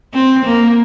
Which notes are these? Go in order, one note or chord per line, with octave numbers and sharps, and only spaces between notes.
C4
A#3